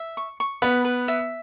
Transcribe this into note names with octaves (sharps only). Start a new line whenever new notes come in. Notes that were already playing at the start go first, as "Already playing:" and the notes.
Already playing: E5
C#6
C#6
B3 B4
B4
E5